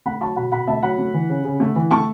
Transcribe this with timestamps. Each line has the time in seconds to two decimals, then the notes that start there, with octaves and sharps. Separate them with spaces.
0.06 A3 F#5 B5
0.21 F#3 A5 C#6
0.36 B2 F#5 B5
0.52 B2 F#5 B5
0.67 A3 E5 A5
0.83 F#3 F#5 B5
0.98 A3
1.14 E3
1.29 C#3
1.45 C#3
1.60 A3
1.76 E3
1.91 A3 A5 C#6